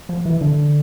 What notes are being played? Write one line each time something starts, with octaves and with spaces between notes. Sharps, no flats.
F3
E3
D3